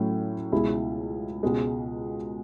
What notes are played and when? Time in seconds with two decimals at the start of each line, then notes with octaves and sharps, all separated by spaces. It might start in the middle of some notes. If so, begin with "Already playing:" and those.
Already playing: A2 F#3 A3 C#4 E4
0.52 C#2 B2 G#3 C#4 E4
1.43 C#2 B2 G#3